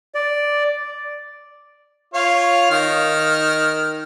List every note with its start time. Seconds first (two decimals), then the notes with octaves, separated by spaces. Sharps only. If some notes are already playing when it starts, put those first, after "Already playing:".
0.15 D5
2.14 F4 C#5 F5
2.71 D#3 F6